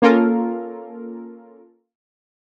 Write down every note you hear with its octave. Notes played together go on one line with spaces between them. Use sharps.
A#3 C#4 F4 A4 A#4